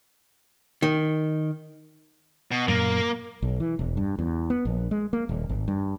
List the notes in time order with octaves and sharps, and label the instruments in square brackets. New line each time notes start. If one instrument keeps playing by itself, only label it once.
[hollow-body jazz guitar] D#3
[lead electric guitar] B2
[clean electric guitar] F#2 A#2 [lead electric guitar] A#3
[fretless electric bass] B1
E3
E1
G2
E2
B3
A#1
G#3
A#3
D#1
G#1
G2